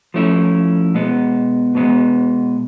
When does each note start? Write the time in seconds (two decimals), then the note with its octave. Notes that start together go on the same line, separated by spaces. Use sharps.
0.14 F3 A3 C#4 E4
0.94 B2 G#3 B3
1.75 B2 G#3 B3